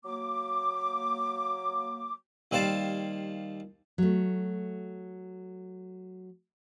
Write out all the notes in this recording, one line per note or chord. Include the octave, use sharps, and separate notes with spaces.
F#3 A#3 D6
D#2 G3 C5 F5 A5
F#3 A3